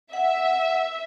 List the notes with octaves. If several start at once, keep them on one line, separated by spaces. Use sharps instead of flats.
E5 F#5